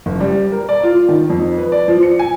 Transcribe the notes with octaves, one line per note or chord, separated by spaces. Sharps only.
F#1
G3
A#4
D5
F4
D#3
F2
B4
D5
F3
C#7
G#5